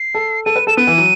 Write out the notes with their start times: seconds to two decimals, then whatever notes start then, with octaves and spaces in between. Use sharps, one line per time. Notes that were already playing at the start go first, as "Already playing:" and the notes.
Already playing: C7
0.15 A4
0.46 A4 D#7
0.56 B4
0.67 A4 E7
0.77 B3 D#7
0.87 E3
0.98 F#3